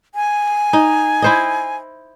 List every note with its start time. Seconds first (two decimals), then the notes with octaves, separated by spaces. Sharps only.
0.15 G#5
0.73 D#4
1.22 E4 C5 D#5